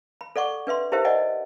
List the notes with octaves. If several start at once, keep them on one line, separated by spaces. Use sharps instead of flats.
B5
A4 D5 F#5 C#6 D6
D4 B4 E5 C6
D#4 E4 G4 A#4 C5 E5
D5 D#5 F#5 G#5